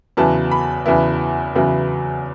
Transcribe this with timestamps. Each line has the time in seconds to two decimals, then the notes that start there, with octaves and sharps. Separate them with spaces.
0.17 E2 C#3 F#3 B3 E4 A5
0.51 B5
0.86 E2 C#3 F#3 B3 E4
1.55 E2 C#3 F#3 B3 E4